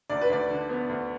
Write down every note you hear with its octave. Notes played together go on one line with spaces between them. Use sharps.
D2 D5
B4
D2 D5
D3
B3
D2